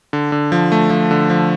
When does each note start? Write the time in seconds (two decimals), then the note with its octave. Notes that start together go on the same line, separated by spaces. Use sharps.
0.13 D3
0.32 D3
0.52 F3
0.72 A3
0.90 F3
1.11 D3
1.30 F3